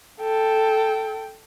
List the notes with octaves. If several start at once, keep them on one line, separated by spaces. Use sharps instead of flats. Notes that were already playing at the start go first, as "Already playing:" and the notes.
A4 G5